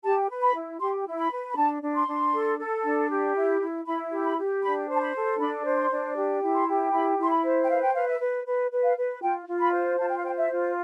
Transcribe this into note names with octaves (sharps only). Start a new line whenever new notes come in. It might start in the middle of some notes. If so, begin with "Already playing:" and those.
G4 A5
B4
B5
E4
G4 C6
E4
B5
B4
B5
D4 A5
D4
C6
D4
A4
A4
D4
G4
E4
E4
E4 B5
G4
B5
G4
D4 B5
C5
A5
B5
A4
D4 B5
C5
C6
D4
G4
E4
C6
G4
E4 B5
E4
C6
B5
C5
G5
B4 F5
G5
B4 F5
E5
B4
B4
B4
F5
B4
F4 G5
F4
B5
C5
F4 A5
G5
F5
C5 G5
E5
F4